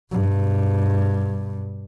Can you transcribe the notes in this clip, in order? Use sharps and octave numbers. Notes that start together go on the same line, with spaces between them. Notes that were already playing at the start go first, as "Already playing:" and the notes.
G2 B2